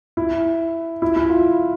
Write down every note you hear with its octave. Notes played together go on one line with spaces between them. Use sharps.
E4
E4
E4
F4